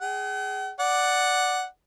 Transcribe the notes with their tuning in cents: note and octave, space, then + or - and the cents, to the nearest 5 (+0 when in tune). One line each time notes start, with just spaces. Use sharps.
G#4 +0 F#5 +45
D5 +0 F#5 +0